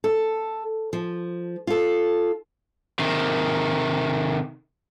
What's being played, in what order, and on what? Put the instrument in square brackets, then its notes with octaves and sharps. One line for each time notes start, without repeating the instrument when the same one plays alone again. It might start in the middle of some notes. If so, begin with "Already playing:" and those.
[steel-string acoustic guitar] A4
F3
F4 A4
[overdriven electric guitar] C3 D#3